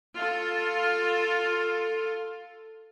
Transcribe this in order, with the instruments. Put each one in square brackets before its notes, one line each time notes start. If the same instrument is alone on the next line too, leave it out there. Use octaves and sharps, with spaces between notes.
[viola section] F4 A4